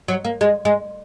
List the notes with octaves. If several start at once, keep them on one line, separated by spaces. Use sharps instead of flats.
F#3
A#3
G#3
G#3